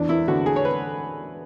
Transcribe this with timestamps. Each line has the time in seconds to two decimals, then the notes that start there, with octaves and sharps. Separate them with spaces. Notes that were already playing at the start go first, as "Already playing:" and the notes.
Already playing: E2 D4
0.09 E4
0.28 D3 A3 F#4
0.46 G#4
0.56 C#5
0.65 B4